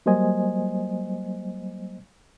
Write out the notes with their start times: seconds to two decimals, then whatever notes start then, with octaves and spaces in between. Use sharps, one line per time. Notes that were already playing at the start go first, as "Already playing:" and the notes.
0.06 F#3 G3 A#3 C5 D#5 G#5